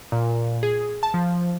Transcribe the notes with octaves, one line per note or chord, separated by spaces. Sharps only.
A#2
G#4
A5
F3